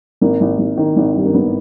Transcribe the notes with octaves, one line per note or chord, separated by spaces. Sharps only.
G#1 A#3
G#1
G#1
D#3
G#1
G2
A#3
G#1 B3